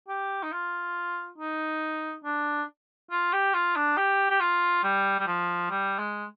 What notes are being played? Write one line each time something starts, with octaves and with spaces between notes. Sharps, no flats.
G4
D#4
F4
D#4
D4
F4
G4
F4
D4
G4
G4
F4
G3
G3
F3
G3
G#3